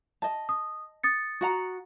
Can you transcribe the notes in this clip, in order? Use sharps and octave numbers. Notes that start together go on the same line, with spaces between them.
D#5 A5
D#6
D#6 A6 C#7
F#4 F#5 A#5